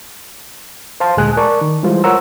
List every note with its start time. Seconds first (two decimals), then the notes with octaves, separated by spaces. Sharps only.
1.00 C5 F5 A5 C6
1.17 D2 A#2 G#3 G#4 G#5 F#6
1.37 A#4 D5 A5 C#6
1.61 D#3
1.83 E3 G3 G#3 F4 C5
2.04 A#4 C5 C#5 F#5 A#5 E6